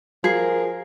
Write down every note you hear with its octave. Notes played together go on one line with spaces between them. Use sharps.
F3 F#4 G#4 A#4 C7